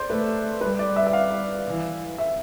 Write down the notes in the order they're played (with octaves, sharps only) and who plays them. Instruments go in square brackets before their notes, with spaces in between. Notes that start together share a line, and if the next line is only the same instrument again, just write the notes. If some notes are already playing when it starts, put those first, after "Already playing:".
Already playing: [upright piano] C5 D5
[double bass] A3 [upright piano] B4
[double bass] G3 [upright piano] B4
[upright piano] D5
E5
E5
F5
[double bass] E3
[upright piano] E5